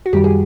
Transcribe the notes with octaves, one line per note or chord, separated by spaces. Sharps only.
F#4
F#2 D#3 G3 G4
G#4